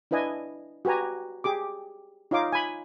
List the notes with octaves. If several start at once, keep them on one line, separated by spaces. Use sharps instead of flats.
D4 E4 B4 D#5 G#5
F#4 G4 B4 G#5 A#5
G4 G#4 D6
D#4 F4 C#5 F5 D6
G#5 B5